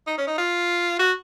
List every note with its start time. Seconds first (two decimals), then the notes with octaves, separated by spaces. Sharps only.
0.07 D#4
0.18 C#4
0.28 D#4
0.38 F4
0.99 F#4